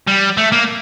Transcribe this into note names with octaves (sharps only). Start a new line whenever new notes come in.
G3
A3
A#3